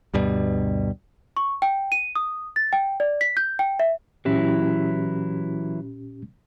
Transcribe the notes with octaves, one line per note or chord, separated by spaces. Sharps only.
D2 G2 B2 G3
C#6
G5
D#7
D#6
A6
G5
D5
B6
G6
G5
E5
A#2 E3 F#3 C#4 E4 G4